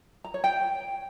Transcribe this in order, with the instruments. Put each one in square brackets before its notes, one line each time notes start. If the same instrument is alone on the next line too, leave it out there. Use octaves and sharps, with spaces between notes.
[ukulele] A#5
C#5
G5